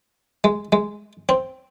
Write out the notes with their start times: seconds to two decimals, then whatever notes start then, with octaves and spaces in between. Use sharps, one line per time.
0.44 G#3
0.72 G#3
1.29 C4